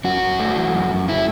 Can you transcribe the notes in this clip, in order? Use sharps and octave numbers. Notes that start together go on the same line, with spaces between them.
F#2 F#4
F#2
A3
E3
F#2
F#2
A3 E4